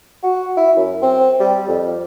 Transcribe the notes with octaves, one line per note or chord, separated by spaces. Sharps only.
F#4
E4
F#2
C4
G3
F2